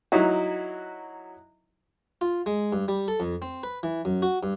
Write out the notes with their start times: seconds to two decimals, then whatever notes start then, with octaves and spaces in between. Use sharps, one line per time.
0.12 F#3 D#4 E4 F#4
2.21 F4
2.46 G#3
2.73 G2
2.88 G3
3.08 A4
3.20 F2
3.42 C4
3.63 B4
3.83 E3
4.05 F#2
4.22 F#4
4.43 G2